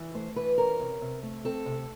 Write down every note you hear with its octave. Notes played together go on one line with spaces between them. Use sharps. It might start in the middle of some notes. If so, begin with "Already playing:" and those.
Already playing: E3
A3 C5
E3 B4
C#4 A#4
C3
C3
A3
C4 A4
C3